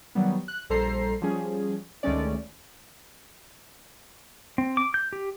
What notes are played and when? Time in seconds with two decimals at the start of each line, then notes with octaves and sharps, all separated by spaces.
0.15 D#3 F#3 G3 B3
0.48 F#6
0.70 A#1 G3 A4 C5 A#5 C7
1.21 F3 G3 C#4 G#4
2.03 D2 D#3 G#3 A3 C#4 D5
4.58 C4
4.77 D6
4.94 G6
5.13 G4